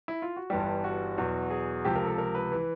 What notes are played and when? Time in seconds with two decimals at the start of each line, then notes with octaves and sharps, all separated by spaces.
0.08 E4
0.22 F4
0.37 F#4
0.50 G1 G2 E3 G3 G4
0.84 F#4
1.18 E2 B2 F#3
1.50 G#4
1.85 C#2 C3 F3 G4
1.96 A#4
2.06 A4
2.18 A#4
2.35 B4
2.52 E3